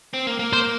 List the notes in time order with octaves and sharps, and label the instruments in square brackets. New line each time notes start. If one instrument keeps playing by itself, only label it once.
[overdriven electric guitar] C4
A#3
A#3
[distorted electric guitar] C5